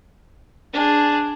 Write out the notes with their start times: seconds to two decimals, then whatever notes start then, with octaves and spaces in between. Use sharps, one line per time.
0.73 D4 G#4